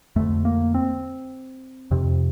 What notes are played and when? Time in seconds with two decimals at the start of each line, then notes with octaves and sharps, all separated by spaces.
0.16 F2 D3 A3
0.45 A#3
0.74 C4
1.91 F2 C3